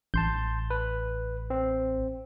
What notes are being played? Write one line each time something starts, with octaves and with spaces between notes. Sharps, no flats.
A1 A5 C6 G6
B4
C4